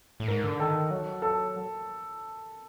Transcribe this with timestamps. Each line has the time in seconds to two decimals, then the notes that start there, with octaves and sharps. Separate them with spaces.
0.20 A2
0.28 G#2 A#4
0.44 D3
0.60 D#3 A4
0.91 F#3
1.22 A4